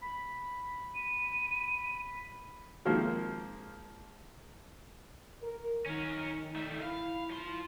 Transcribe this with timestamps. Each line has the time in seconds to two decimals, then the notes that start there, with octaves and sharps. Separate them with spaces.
0.01 B5
0.95 D#7
2.85 D#3 F3 G#3 A#3 C4
5.42 A#4
5.86 D#3 C#4 A#4
6.56 G3 A3
6.82 E4 F5
7.30 F3 C6